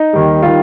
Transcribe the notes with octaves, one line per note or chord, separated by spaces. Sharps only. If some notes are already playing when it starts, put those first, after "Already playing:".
Already playing: D#4
D#2 D#3 G3
D#3 G3 F4